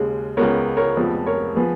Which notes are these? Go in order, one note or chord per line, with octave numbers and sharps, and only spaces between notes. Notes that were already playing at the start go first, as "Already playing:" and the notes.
Already playing: D#2 C#3 G#3
C#2 C#3 G#3 B3 A#4 C#5
A#4 C#5
F1 F2 F3 G#3 B3
A#4 C#5
F3 B3 G#4 B4